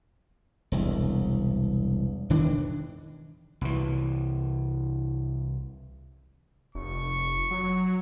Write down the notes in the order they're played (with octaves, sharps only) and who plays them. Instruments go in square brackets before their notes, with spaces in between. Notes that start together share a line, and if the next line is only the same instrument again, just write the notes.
[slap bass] E1 C2
E1 D#3 E3 D4
C2 E3
[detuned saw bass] F1 [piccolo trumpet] C#6
[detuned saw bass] F#3